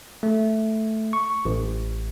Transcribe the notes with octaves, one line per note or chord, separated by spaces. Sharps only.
A3
C#6
A1